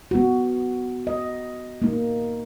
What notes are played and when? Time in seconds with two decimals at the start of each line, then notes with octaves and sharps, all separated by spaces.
0.11 B3 F#4
1.07 D#5
1.82 A#3 D#4